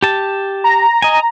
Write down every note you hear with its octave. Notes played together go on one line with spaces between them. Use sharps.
G4 A5
A#5
D#5 G#5